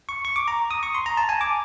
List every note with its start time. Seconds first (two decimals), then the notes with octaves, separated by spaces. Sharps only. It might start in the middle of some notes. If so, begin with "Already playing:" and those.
0.09 C#6
0.25 C#6
0.36 D6
0.48 A#5
0.71 D#6
0.83 C#6
0.95 C6
1.06 A#5
1.17 A5
1.29 G#5
1.41 D6